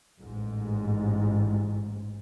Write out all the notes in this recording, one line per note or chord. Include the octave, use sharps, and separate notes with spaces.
A1 G#2